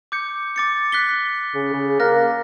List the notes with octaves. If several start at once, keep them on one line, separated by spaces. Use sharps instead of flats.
D6 G6 C#7
D6 A6 C#7
F#6 B6 G7
C#3
C#3
A#3 F6 F#6 A#6